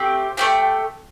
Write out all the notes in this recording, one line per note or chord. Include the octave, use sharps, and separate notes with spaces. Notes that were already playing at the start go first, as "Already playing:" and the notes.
Already playing: A3 C4 G4
A3 C4 G4 G5